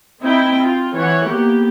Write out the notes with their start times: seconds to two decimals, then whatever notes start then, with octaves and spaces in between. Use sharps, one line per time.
0.20 C4 D#4 E4 G5
0.64 F4
0.95 E3 C#5 F#5
1.26 A#3 B3 G4